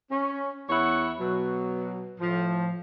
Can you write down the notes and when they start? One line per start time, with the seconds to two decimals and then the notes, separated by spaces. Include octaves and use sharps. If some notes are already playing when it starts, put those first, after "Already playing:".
0.11 C#4
0.69 E2 E3 E4 C#5 F#5
1.20 B2 F#3
2.20 A2 F3